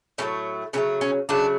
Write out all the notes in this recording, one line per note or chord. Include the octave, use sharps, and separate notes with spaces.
A2 F#3 A3 C#4
C#3 F#3 A3 C#4
C#4
C#3 F#3 A3 D4